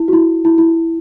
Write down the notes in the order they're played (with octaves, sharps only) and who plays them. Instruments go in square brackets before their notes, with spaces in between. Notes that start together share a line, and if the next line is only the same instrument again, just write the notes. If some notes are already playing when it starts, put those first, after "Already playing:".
Already playing: [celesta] E4
F#4
E4
E4
E4